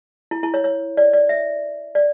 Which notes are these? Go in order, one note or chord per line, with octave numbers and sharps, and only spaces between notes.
E4
E4
C#5
C#5
D5
D5
E5
D5